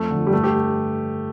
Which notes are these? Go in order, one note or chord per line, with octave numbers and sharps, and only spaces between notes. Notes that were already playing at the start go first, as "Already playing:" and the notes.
Already playing: F2 A3
D3 F3
G3
G2 A3
G4